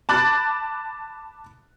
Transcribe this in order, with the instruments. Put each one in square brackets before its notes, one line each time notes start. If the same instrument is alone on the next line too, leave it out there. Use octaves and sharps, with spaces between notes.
[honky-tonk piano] A5 B5 D6 F#6 A6